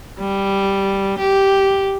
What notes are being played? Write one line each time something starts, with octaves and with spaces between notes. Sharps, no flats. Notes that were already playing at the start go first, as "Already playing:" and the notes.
G3
G4